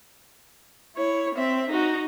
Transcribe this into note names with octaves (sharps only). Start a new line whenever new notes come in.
E4 C#5
C4 E5
D#4 F#4